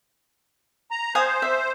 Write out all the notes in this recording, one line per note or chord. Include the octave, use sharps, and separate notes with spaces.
A#5
C5 F5 G#5 D#6
E5